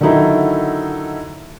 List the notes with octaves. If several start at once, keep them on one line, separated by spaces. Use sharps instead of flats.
D3 D#3 F#3 D#4 E4